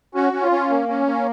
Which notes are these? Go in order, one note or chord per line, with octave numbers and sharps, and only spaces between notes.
C#4 F#4
C#4
F4
C#4
A#3
C#4
A#3